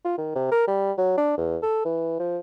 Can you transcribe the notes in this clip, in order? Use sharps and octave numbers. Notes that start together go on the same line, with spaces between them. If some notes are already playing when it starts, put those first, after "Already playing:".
F4
D#3
C3
A#4
G3
F#3
D4
E2
A4
E3
F3